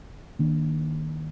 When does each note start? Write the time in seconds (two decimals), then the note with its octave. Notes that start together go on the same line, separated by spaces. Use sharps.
0.39 D#3 A#3 D4